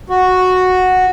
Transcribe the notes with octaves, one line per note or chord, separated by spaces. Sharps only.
F#4